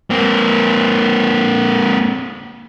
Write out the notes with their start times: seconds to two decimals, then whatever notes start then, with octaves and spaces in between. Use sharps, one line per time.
0.10 A#3 C4